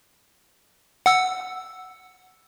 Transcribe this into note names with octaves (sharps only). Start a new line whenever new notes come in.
F#5 E6